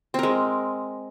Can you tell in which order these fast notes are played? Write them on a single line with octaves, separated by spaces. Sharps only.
C4 A#4 G#3